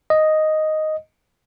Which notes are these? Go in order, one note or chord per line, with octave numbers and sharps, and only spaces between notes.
D#5